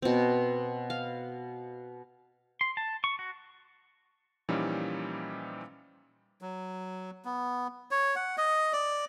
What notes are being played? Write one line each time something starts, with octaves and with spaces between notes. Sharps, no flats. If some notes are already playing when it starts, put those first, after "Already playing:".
B2 C4
F5
C6
A5
C#6
F#4
A#2 E3 F3 G3 C#4 D#4
F#3
B3
C#5
F#5
D#5
D5